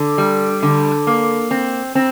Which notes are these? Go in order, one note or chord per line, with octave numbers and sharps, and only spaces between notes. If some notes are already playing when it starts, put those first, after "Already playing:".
Already playing: D3
G3
D3
A#3
C4
C4